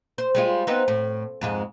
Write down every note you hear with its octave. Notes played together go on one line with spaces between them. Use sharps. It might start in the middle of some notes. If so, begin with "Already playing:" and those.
C5
G3 G#3 F4
B3 C4 D#4
A2
F2 G#2 G#3